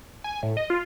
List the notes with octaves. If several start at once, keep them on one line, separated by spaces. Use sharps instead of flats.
G#5
A2
D#5
F4